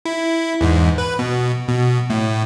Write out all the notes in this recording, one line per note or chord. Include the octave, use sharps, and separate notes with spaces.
E4
E2 G#2
B4
B2
B2
A2